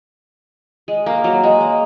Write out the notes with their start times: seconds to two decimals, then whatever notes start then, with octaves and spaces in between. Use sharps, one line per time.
0.88 G#3
1.06 A#3
1.24 F#3
1.44 G#3
1.61 A#3